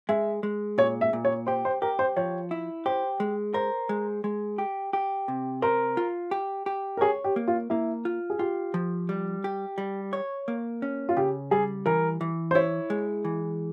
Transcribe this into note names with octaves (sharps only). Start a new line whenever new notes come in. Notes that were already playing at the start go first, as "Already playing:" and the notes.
G#3 E5
G#3
A#2 C#5
E5
A#2
C#5
G4 C5
C5
G4 A#4
C5
F3 C#5
E4
G4 C5
G#3
A#4 C5
G#3
G#3
G4
G4
C3
A#4 C5
F4
G4
G4
A#4
G#4 C#5
G4
A#3
F4
A#3 E4
F4
G#4
F4 G4
F3
G3
G4
G3
C#5
A#3
C#4
F4
C#3 G4
G3 G#4
E3 A#4
E3
C5
E4 C#5
G#3
E3